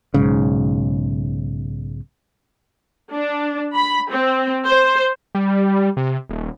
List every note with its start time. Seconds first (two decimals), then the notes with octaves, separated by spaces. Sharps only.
0.14 B1 G#2 C#3
3.13 D4
3.74 B5
4.11 C4
4.65 C5
5.35 G3
5.97 C3
6.30 D#1